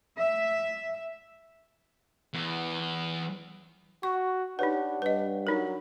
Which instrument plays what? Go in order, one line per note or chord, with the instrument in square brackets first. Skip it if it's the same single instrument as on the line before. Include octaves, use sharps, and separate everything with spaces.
[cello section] E5
[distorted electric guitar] E2 E3
[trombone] F#4 [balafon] C#6
[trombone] D4 [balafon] D#4 B4 [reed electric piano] G4 C#5 F#5
[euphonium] G2 [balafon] B4 D#5
[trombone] F#3 [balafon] D4 D#4 A#4